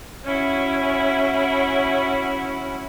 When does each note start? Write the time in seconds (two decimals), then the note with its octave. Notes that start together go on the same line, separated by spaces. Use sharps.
0.24 C#4 E4 F#4